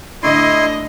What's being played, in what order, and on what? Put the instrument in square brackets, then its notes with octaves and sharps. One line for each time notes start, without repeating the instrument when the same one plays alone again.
[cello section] A2 D3 D#5 [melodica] E4 C6